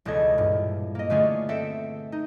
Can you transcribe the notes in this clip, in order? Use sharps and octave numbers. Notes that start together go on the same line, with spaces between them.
E1 C#2 B3 A4 D#5 G#6
G2 A#2
A#3 D#5
D3 A3 B3 C#4 F4 G#4
C4 A4 E5 F#5 G5
D#4